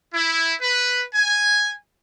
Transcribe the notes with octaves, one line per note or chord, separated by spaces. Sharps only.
E4
B4
G#5